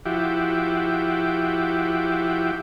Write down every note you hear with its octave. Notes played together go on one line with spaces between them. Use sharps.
F3 E4 F#4 G4 D6